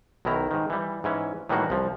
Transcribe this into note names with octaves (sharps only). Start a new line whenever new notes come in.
B1 B2 D#3 E4 A#5
G#2 D#3
E3 G3
G#2 E3 C#4
A2 D#3 E3 G3 A#3 F#4
C2 F3